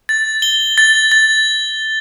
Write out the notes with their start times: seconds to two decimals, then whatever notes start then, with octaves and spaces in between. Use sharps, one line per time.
0.09 A6
0.42 G7
0.78 A6
1.12 A6